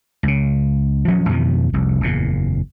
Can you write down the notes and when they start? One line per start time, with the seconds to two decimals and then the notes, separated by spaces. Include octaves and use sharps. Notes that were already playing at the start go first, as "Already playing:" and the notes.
0.23 C#2 C#3
1.07 D#1 F3 F#3 C#4
1.29 F2 B2 D#3 E3
1.73 F1 C2
2.01 F#1 E2 A#2